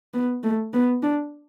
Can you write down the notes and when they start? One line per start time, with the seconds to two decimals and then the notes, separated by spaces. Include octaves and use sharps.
0.14 B3
0.43 A3
0.73 B3
1.03 D4